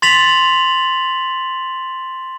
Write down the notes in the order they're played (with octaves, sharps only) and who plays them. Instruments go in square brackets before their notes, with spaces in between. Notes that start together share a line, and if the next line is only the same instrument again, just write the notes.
[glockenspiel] C6 A6 B6 F7 F#7